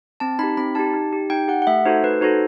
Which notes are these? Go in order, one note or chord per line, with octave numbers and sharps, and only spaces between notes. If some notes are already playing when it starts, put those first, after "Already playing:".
C4 A5
D#4 G4 B5
C4 B5
D#4 G4 A5
D#4
G4
D#4 G5
G4 F#5
F#5
A3 E5
D#4 F#4 A4 C5
A3 B4
D#4 F#4 A4 C5